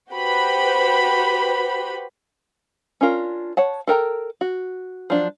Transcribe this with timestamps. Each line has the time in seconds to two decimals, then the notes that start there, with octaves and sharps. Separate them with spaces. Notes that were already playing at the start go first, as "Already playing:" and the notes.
0.11 F#4 G4 B4 C5 B5
3.01 C#4 D4 F4 A#4
3.57 C#5 F#5 A5
3.87 A4 A#4 G5 A#5
4.41 F#4
5.10 F3 F#3 D4